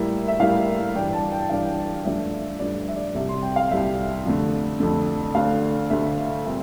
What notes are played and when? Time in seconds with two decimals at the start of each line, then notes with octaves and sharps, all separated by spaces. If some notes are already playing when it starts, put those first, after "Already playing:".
Already playing: A2 G3 A#3 E4 E5
0.28 E5
0.40 A2 G3 A#3 E4 F5
0.95 G2 E3 G3 D4 G5
1.13 A5
1.32 G5
1.49 G2 E3 G3 D4 F5
2.05 G2 F3 A3 D4 E5
2.60 G2 F3 A3 D4 D5
2.89 E5
2.96 D5
3.15 C2 C3 G3 E5
3.29 C6
3.42 G5
3.56 F5
3.70 C2 C3 G3 E5
4.25 F2 D3 A3
4.80 F2 D3 A3
5.35 D2 D3 A3 F5
5.90 D2 D3 A3 E5
6.45 A#2 G3 C4 E5